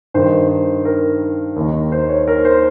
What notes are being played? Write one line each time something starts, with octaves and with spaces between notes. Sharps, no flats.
G2 D#3 C5
A#4
D#2 D#3
C5
C#5
A#4
C5